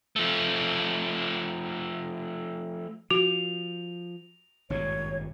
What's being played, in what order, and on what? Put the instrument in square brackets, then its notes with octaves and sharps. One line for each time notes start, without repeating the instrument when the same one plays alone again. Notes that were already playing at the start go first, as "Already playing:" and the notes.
[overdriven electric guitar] F3 A3
[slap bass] F3 [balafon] F#4 [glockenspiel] F7
[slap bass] G#1 G2 A#2 [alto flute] C#5